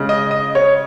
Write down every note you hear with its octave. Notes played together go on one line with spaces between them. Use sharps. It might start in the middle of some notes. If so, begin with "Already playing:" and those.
Already playing: C#3 G#3
D#5
D#5
C#5